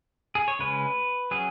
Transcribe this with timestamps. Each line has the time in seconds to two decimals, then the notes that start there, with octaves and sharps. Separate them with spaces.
0.35 G#4
0.48 C#5
0.59 C#3 G#3 C#4 B4
1.31 F#3 C#4 G#4